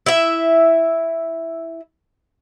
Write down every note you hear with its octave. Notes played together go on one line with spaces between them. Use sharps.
E4 E5